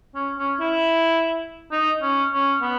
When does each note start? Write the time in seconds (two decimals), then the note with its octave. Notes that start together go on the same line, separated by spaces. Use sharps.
0.15 C#4
0.38 C#4
0.60 E4
1.72 D#4
2.02 C#4
2.33 C#4
2.62 B3